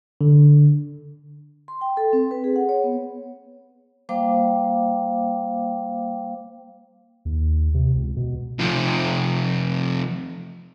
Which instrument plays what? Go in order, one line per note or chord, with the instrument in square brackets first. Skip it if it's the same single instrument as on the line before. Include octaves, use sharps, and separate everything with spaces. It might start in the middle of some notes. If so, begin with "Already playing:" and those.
[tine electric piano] D3
[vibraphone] C6
G5
A4
C4
B4
G#4
F#5
C#5
B3
G3 A#3 C5 F5 G5 D6
[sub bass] D#2
C3
C#2
B2
[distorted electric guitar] F2 C3